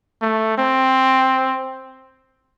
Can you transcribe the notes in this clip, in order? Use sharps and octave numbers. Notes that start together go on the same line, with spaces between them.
A3
C4